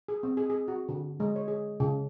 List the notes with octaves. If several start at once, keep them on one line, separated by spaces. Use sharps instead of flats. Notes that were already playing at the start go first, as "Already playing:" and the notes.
G#4
C4
G#4
G#4
F#4
D3
G#3
C#5
G#4
C#3